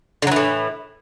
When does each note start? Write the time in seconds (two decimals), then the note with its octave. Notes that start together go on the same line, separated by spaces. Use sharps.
0.22 D3
0.27 F#3
0.32 E3
0.36 A2